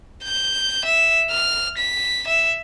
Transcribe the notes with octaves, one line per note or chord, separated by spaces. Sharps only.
G6
E5
F6
B6
E5